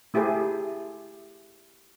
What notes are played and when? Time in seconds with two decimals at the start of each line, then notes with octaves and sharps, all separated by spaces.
0.14 A3 E4 G4 G#4 C5